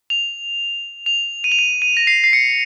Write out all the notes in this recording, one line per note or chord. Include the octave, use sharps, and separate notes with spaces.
F7
F7
D#7
F7
D#7
D#7
A#6
C7
C7
C#7